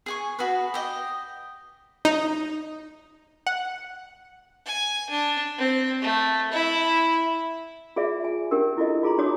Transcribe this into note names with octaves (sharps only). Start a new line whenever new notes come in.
G#4 G#5 C#6
F#4 G#4 B4
G4 D#5
D#4
F#5
G#5
D4
C4
A3
E4
F4 G#4 D5 E5
G#5
C#4 D4 G4 A#4
E4 F4 A4 D#5
F4 G#4 A#5 C6
D4 D#4 F#4 C#5 D6 D#6